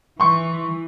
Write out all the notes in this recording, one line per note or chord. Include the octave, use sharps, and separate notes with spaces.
E3 C6 C#6